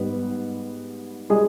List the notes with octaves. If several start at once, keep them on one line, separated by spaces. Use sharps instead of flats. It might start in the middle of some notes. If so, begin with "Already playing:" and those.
Already playing: G#2 G3 B3 B4
G3 G#3 G#4